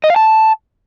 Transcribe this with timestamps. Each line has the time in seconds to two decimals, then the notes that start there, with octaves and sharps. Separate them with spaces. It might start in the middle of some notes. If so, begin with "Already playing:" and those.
0.04 D#5
0.10 F5
0.16 A5